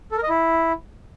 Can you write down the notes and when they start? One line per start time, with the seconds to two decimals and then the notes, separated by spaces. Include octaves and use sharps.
0.12 A4
0.17 A#4
0.23 D#5
0.29 E4